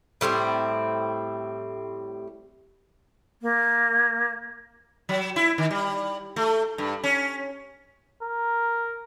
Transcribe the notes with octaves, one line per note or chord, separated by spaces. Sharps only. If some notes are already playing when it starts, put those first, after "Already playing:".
A2 G3 C4 E4
A#3
F#3
E4
D#3
G3
A3
G2
C#4
A#4